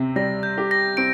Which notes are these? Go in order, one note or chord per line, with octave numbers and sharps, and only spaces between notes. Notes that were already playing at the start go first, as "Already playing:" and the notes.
Already playing: C3 C4
G3 A#6
G6
G4
A#6
C4 D7